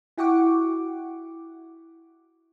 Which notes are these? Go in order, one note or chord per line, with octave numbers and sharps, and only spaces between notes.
E4 F#4 F#5 G5 C#6 D6